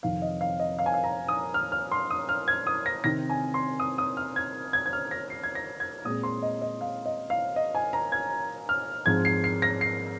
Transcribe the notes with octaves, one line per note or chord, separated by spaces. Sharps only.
F2 C3 D#3 F5
D#5
F5
D#5
F5
G#5
F5
A#5
D#6
F6
F6
C6
D#6
F6
G#6
D#6
A#6
C3 D#3 C4 A#6
G#5
C6
D#6
D#6
F6
G#6
G#6
G#6
F6
A#6
C7
G#6
A#6
G#6
A#2 G#3 C4 D#6
C6
D#5
D#5
F5
D#5
F5
D#5
G#5
A#5
G#6
F6
G#2 F3 G#3 C4 G#6
C7
C7
A#6
C7